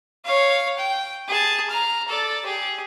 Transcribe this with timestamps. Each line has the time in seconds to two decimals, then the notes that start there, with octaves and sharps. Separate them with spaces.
0.25 C#5 F5
0.78 G5
1.28 G#4 A5
1.70 A#5 F6
2.08 A4 D5
2.45 G4 G#4